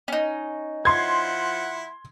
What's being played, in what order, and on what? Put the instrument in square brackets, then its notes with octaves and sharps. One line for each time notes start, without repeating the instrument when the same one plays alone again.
[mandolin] C#4 D#4
[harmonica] F3 E4 F#5 [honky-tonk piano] C6 G#6